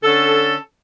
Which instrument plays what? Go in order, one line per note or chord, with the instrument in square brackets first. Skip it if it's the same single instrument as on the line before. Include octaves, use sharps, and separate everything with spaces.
[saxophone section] D3 C#4 A4